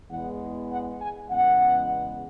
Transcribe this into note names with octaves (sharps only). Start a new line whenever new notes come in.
E2 E3 G#3 B3 F#5
F#5
G#5
E2 C#3 G#3 B3 F#5